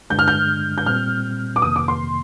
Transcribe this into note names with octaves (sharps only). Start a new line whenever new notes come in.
G2 D3 G#3 D4 G6
F6
G6
G6
A#2 G3 C4 F6
D6
F2 C3 D#3 A#3 D#6
D6
C6